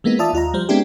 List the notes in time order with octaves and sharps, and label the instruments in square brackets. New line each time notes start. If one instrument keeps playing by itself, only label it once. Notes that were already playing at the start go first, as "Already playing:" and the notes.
[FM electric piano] E3 G#3 A#3 B3 D#4
F4 D5 E5 A5 D#6
D#2 F4 D#5 A#5
F3 G3 C5
G#3 B3 C4 D4 E4 G4